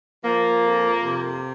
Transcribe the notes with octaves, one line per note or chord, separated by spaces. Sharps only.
F3 A#3
F2
C3